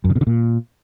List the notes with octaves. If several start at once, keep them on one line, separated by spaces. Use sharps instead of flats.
F#2
C#3
B2
D3
A#2